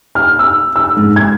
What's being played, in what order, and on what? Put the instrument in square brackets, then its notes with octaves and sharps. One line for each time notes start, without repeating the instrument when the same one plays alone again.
[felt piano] F6
E6
E6
G#2
G#6